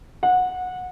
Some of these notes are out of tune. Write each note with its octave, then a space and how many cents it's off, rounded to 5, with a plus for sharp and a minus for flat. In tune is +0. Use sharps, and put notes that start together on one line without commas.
F#5 -20